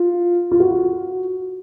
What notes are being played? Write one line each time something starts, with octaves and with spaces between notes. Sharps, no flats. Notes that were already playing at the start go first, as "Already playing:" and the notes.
Already playing: F4
F4
F#4